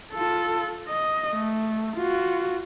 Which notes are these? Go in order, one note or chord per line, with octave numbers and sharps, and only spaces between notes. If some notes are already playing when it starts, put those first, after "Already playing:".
F4 A4
D#5
A3
F4 F#4